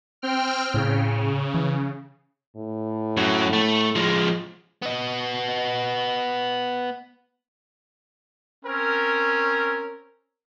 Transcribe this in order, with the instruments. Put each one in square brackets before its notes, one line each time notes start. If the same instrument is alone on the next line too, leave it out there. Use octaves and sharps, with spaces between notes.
[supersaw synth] C4 G5 F6
[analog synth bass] A2 [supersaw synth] C#3
[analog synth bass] E3
[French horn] A2
[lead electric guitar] F#2 F#3
A3
F3 G#3
[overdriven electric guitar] B3 D#5
[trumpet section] C4 A#4 [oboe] C#4